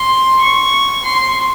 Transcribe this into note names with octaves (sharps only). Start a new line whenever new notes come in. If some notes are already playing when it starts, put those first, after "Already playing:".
Already playing: C6
C#6
C6